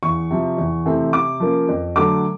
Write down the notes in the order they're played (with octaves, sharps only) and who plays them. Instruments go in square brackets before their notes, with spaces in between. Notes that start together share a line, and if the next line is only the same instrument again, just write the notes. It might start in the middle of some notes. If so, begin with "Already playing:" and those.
[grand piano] E2 C#6
C3 F3
E2
C3 E3 A3 C4
C3 D6
F3 A#3 C#4
F2
D3 F#3 A3 D6